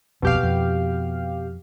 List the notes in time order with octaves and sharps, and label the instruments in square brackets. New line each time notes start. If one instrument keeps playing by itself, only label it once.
[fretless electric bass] D#1 B1 F2 [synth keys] B2 G4 F5
[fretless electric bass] F2